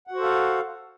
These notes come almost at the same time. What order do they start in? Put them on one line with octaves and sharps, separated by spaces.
F#5 F#4 C5 A4 F5